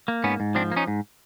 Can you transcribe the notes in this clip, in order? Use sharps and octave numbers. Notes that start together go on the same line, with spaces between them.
A#3
G#2 B3 C#4
G#2
F3 C4 D4
A#3
C#4 D#4
G#2